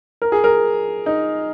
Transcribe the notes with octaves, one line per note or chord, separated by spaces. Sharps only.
A#4
G#4
A#4
D#4